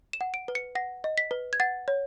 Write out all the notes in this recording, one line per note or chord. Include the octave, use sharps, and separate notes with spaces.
E7
F#5
D7
B4
C#7
F#5 A#6
D#5
B6
B4
G#6
F#5 A6
C#5